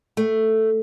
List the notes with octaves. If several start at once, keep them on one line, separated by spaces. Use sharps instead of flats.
A3